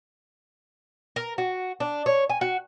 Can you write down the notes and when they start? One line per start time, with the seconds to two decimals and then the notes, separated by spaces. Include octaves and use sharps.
1.16 A#4
1.38 F#4
1.80 D4
2.06 C#5
2.30 G#5
2.41 F#4